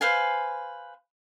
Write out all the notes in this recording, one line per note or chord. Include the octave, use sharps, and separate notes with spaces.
B4 C5 F5 G#5